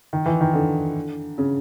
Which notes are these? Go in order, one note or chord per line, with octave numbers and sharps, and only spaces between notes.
D#3
E3
D#3
D3
C#3